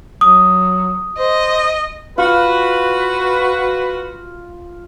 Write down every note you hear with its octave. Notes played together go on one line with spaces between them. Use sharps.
F#3 D#6
C5 D#5
F4 F#4 B4